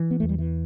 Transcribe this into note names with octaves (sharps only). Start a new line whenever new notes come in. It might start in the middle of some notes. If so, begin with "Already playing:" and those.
Already playing: E3
B3
E2 A3
G3
E3